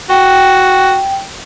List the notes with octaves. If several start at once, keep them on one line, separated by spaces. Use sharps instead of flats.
F#4 G5